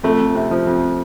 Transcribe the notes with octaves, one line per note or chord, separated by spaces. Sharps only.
F2 A3
F2
C3
F3
F2